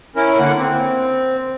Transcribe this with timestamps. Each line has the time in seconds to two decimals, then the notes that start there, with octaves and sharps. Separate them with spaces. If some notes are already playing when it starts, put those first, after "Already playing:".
0.16 C#4 E4 A#4
0.39 D3 A#3 F#5
0.58 C4